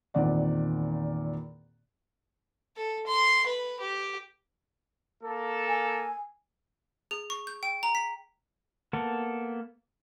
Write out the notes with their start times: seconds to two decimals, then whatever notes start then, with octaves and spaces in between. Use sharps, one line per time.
0.14 E2 A#2 D#3 C4 D5 F#5
2.77 A4
3.07 C6
3.47 B4
3.81 G4
5.23 A#3 A4
5.68 G#5
7.11 G#4
7.30 C#6
7.47 G6
7.63 G5
7.83 A#5
7.95 B6
8.93 A#3 B3 A4